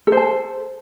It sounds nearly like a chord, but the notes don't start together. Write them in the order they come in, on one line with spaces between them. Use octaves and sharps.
A4 C5 A5